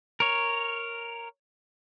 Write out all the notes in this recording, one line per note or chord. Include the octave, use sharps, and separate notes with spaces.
A#4 C#5